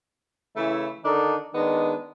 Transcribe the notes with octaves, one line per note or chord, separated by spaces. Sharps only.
C#3 E3 A3 E4
D3 D#3 D4 D#4 A4
D#3 G#3 B3 D4 D#4